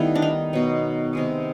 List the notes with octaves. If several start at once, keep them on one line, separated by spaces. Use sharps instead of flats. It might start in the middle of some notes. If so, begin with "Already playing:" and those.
Already playing: D#3 G3 A3 B3 E4
D4
D#4
B2 F#3 B3
C3 D#3 G#3 B3